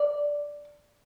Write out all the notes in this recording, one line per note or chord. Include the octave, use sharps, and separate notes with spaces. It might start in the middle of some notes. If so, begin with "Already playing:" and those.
Already playing: D5